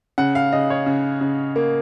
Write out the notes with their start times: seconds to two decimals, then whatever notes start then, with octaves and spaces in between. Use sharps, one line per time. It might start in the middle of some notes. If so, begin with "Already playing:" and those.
0.18 C#3 F#5
0.35 F5
0.53 C#3 D#5
0.70 C#5
0.86 C#3
1.21 C#3
1.56 A#3